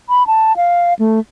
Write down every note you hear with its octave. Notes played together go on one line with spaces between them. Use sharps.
B5
A5
F5
A3